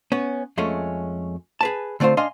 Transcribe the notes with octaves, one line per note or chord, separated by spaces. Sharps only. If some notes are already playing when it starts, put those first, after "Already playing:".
B3 C#4
F2 G#3 A3 C#4
G#4 B4 A5
D3 A3 C4 F4 C5
D4 D#5 F5 G#5 C6